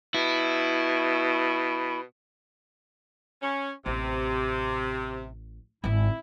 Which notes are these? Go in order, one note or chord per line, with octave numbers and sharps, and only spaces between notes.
B2 E4
C#4
A1 C3
G#1 G#2 E4